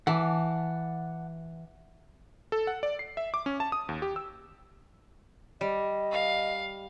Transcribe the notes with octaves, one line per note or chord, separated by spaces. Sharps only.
E3 F#5 A5 D6
A4
F#5
D5
C7
E5
D6
C#4
A5
D#6
D#2
G4
E6
G3 D#5
F5